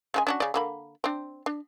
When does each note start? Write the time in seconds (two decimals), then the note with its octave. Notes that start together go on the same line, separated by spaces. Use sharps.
0.14 C#3 G#3 G#5
0.27 C#4 D4 F#4
0.40 C#3 D5
0.54 D3 A#3 B5
1.04 C4 D4
1.46 D4